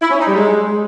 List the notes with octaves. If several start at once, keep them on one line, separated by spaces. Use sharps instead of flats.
E4
C#4
D#4
G3
G#3